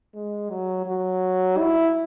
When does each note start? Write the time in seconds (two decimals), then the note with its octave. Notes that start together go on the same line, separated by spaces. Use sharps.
0.15 G#3
0.50 F#3
0.86 F#3
1.59 E4